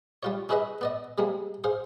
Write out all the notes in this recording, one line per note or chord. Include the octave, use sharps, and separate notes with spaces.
G3 F4 C#5
C#4 E4 G#4 B4 D#5 E5
B3 D5 D#5
C3 G3 G#3 A#3
G#4 C5 F5